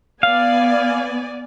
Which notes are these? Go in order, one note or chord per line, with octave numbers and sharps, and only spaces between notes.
B3 D5 F5 G#5